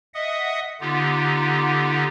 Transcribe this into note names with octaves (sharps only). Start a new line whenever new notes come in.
D#5 E5 F#5 D#6
D3 B3 D#4 F4 G4